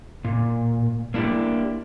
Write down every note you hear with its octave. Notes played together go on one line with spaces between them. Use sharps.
A#2
A#3 D4 E4 G4